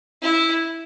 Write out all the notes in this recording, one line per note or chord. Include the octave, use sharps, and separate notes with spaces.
E4